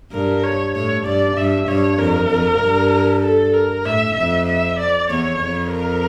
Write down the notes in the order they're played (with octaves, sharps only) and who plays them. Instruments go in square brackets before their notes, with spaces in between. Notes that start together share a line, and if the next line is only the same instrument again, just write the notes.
[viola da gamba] G2 [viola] A#4
[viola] C#5
[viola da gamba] A2 [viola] C#5
[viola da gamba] G2 [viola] D5
[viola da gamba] G2 [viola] E5
[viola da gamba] G2 [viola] C#5
[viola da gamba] F2 [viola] A#4
[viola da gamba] F2
G2
[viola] A4
A#4
[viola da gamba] A2 [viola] E5
[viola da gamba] F2 [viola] E5
[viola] E5
D5
[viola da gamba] E2 [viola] C#5
[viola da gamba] F2
[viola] A#4